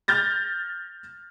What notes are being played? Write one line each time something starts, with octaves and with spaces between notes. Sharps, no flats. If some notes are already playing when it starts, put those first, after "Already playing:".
F6 G6 A6 A#6